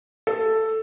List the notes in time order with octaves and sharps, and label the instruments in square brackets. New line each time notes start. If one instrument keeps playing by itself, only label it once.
[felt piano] A4